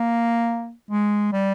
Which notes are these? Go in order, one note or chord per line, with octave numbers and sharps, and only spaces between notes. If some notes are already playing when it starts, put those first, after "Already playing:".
Already playing: A#3
G#3
G3